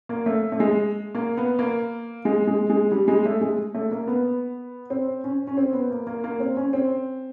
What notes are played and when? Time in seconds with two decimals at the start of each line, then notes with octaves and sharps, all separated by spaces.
0.09 A#3
0.26 A3
0.52 A3
0.60 G#3
1.15 A#3
1.37 B3
1.59 A#3
2.25 G#3
2.47 G#3
2.70 G#3
2.91 G3
3.08 G#3
3.25 A3
3.41 G#3
3.74 A3
3.91 A#3
4.07 B3
4.90 C4
5.24 C#4
5.47 C#4
5.57 C4
5.73 B3
5.90 A#3
6.07 A#3
6.24 A#3
6.40 C4
6.57 C#4
6.73 C4